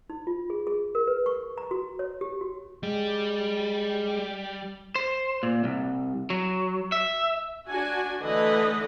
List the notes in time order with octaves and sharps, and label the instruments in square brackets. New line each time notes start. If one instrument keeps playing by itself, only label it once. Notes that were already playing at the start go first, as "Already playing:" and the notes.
[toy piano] D#4
F4
G#4
G#4
A#4
B4
C#6
A#5
F#4
C#5
G4
F#4
[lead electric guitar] G3 [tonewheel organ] G#3
[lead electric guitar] C5
A#2
C2
F#3
E5
[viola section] D4 F#4 G#5
D3 E3 A3 B4 D#5